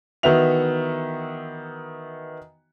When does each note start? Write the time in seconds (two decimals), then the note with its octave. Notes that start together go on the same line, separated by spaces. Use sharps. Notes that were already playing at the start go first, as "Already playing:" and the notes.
0.23 D#3 E3 B3 F#4 E5 F7